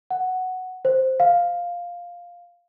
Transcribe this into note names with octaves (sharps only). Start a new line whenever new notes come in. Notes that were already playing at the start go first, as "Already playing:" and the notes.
F#5
C5
F5